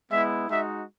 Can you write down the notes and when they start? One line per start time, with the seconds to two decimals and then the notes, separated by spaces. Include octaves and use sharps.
0.11 G#3 B3 E4 E5
0.48 G#3 D#4 F#4 E5